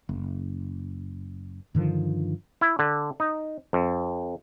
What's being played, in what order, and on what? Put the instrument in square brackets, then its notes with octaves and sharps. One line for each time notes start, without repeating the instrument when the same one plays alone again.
[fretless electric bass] F#1
G2 D3 D#3 F3
[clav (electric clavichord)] E4
D3
D#4
F2